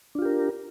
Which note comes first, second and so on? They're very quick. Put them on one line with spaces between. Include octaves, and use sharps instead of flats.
D4 F4 G4 A#4